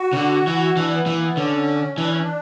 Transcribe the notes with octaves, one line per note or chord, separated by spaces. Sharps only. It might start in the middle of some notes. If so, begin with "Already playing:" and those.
Already playing: F#4
C#3
D3
E3
E3 D4
B3
E3 A#3
B3
D3 C#4
E3 D4
C#4
D4